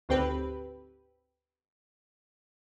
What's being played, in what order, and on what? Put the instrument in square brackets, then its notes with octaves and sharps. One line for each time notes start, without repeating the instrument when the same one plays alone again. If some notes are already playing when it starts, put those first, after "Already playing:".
[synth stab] G#1 D2 C4 G4 B4